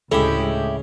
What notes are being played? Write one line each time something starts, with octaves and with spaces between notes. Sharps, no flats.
D2 A2 C#3 G#3 E4 G4 A4